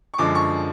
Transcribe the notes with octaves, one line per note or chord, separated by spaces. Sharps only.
C#6
F#2 D3 F3 G#3 D6
C#6